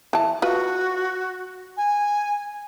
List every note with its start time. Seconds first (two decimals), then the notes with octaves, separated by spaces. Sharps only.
0.13 E3 A5
0.42 F4 F#4 B4
1.77 G#5